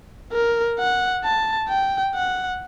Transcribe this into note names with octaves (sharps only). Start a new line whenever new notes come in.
A#4
F#5
A5
G5
F#5